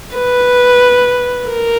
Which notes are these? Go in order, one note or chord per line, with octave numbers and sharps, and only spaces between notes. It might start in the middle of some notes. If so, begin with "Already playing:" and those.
B4
A#4